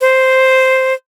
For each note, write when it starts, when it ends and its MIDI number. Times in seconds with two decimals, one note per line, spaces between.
0.01 0.93 72